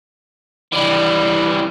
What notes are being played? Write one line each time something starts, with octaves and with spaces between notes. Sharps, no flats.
E3 G3